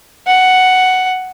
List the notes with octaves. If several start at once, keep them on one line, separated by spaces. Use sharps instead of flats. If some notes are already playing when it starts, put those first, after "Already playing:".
F#5